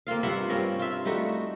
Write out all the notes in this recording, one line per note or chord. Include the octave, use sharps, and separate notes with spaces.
A#3 C4 F4 F5
G2 F4 E5 F#5
G2 C4 C#4 A#4
F4 E5
G3 A3 D#4 F#4